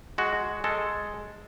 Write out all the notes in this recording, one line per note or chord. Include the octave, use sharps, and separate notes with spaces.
G#3 F#4
G#3 A4